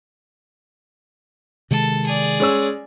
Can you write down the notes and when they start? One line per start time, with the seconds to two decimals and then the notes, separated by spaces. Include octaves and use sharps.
1.71 C3 D#3 G#3 A4
2.06 G#4 D5
2.40 G#3 C#4 E6